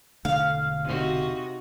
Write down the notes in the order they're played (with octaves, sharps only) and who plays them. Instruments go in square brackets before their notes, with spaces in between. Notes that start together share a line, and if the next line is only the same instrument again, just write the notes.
[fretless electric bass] E1 D3 A3 [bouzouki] F5
[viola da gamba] C3 D#4 F#4